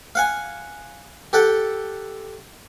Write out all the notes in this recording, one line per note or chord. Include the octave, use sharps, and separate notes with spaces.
F5 F#5 G#5
G4 A4 F#5 G5